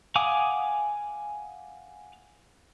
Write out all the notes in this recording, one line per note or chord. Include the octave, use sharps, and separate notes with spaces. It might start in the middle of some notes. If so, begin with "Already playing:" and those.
F5 F#5 G#5 D6 D#6